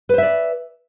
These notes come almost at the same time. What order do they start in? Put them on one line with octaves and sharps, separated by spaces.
B4 C5 E5 D5